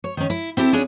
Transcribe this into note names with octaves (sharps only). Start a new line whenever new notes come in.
C#5
D#3 C#4
E4
C4 E4 G4 A4
C#4 D4 F4 G#4